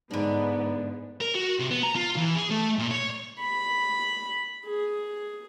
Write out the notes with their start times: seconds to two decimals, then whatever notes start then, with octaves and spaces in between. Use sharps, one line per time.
0.11 G#2 D3 B3 D4 D#4
1.21 A#4
1.35 F#4
1.59 C3
1.71 B3
1.83 A#5
1.96 F4
2.17 E3
2.36 G#4
2.51 A3
2.78 A#2
2.91 C#5
3.40 B5
4.66 G#4